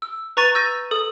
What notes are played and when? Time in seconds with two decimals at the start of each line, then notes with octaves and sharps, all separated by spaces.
0.02 E6
0.37 B4 A#5 C#6 A6 D#7
0.55 E6 G6 A6 A#6 D#7
0.91 A4 D#6